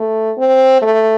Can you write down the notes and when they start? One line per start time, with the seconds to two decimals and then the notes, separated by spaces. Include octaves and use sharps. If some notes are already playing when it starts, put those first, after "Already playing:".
Already playing: A3
0.38 C4
0.82 A3